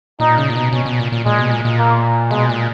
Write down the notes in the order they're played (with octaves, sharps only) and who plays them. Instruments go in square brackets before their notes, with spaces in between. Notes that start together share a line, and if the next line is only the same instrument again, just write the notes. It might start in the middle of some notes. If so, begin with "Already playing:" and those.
[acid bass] A#2 [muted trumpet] D#4
[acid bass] C#3
A#2
B2
[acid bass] B2 [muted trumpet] C#4
[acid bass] B2
A#2
A#2
[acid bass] A#2 [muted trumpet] G#3
[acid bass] B2
A#2
A#2
[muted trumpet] A#3
[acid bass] B2 [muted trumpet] G#3
[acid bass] A#2